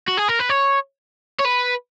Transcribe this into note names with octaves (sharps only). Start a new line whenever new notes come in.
F#4
G#4
A#4
B4
C#5
C#5
B4